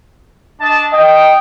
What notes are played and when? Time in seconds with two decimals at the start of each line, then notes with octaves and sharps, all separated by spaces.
0.60 D4 D#5 A5
0.92 D#5 G5